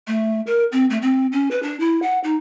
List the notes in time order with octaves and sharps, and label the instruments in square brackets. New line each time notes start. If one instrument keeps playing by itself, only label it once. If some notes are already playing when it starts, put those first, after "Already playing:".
[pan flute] A3
A#4
C4
A3
C4
C#4
B4
D4
E4
F#5
D#4